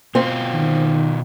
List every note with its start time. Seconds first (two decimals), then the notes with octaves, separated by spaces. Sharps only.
0.15 B2 C4 F4
0.54 D#3